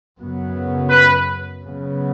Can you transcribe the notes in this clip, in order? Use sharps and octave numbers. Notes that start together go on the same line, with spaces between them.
F#2 C#3 F#3 B3
B4
C#3 F#3 B3